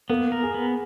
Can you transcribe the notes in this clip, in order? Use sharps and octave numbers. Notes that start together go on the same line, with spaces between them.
A#3 B3
A#4
G#4
B3